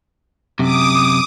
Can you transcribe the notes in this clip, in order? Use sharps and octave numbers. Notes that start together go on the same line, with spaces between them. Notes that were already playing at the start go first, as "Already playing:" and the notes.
F#2 C3 D6 D#6